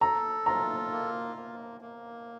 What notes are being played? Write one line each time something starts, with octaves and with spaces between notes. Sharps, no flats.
A4 A#5
F4 A#5
A#3
A#3
A#3